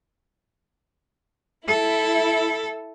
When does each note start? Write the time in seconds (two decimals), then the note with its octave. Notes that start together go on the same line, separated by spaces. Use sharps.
1.68 E4 A4